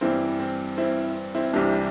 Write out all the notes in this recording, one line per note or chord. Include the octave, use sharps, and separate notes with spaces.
G2 E3 G3 C4 E4
C4
C4 E4
C4 E4
C2 C3 E3 G3 D4 G4